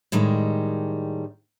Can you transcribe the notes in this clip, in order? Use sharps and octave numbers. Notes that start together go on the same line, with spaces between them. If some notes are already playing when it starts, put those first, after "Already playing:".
A2 D#3 G3 G#3